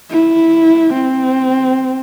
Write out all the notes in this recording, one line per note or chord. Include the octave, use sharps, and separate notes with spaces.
E4
C4